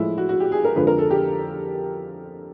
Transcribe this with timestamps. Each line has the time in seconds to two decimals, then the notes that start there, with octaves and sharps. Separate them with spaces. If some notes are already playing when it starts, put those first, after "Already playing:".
Already playing: A2 F3 G#3 E4
0.18 F#4
0.29 F#4
0.40 G4
0.52 G#4
0.64 A#4
0.75 F2 D3 F3 G#3 B4
0.87 A#4
0.98 A4
1.11 G4